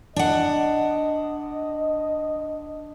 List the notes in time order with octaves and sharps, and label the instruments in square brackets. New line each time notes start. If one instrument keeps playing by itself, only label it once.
[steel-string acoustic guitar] D4 F#5 [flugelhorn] D#5